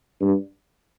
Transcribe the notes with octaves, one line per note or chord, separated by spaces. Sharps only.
G2